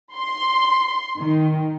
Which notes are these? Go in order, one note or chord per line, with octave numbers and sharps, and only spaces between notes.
C6
D#3